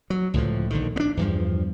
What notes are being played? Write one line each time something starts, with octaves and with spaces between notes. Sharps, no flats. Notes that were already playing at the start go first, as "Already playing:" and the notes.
F#3
C#2 A2 D3 F3
A#1 D3 D#3
B3 D4
E2 G2 F3